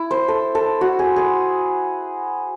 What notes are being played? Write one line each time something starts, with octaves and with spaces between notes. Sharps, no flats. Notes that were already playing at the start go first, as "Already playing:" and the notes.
Already playing: E4
C5
A4
A4
F#4
G#4
G#4